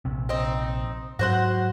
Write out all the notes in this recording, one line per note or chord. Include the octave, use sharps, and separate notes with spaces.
A#1 C3
C4 D#4
G#2 F#3 F#4 C5 F#5